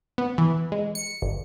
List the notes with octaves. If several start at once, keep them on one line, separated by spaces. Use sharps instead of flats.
B3
E3
G#3
C#7
G1